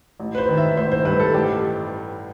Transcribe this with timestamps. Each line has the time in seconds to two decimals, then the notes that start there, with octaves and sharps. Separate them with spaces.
0.20 A1
0.35 B4
0.38 C5
0.49 D#3
0.57 E5
0.77 A1 C5
0.92 C5
1.05 G2 B4
1.20 A4
1.34 A1 G4